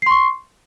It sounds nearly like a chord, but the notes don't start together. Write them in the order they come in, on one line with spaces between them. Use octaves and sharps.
C7 C6 C#6